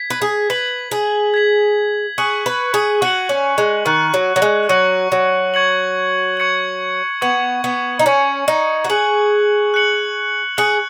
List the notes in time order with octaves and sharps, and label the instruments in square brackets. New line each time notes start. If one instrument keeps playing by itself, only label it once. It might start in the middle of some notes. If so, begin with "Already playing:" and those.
Already playing: [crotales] G#6 B6
[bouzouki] B4
G#4
[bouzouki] B4 [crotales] G#6 B6 F#7
[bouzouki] G#4
[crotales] G#6 B6 F#7
[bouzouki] G#4 [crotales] C#6 F#6 C#7 F#7
[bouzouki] B4
G#4
[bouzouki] F#4 [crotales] C#6 F#6 C#7 F#7
[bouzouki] C#4
G#3
[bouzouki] D#3 [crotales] C#6 F#6 C#7 F#7
[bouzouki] F#3
F#3
G#3
[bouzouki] F#3 [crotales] C#6 F#6 C#7 F#7
[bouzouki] F#3
[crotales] C#6 G#6 C#7 F#7
C#6 G#6 C#7 F#7
[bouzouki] B3 [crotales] C#6 G#6 C#7 F#7
[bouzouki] B3
D#4
[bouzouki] C#4 [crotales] C#6 G#6 C#7 F#7
[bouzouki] D#4
F#4
[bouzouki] G#4 [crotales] F#6 C#7 F#7
[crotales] F#6 C#7 F#7
[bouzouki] G#4 [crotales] F#6 C#7 F#7